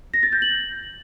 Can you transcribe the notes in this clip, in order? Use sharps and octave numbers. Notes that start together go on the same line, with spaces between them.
A#6
A6
G6
F#7